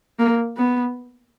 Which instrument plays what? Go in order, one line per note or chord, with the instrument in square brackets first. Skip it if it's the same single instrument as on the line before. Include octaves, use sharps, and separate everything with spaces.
[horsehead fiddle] A#3
B3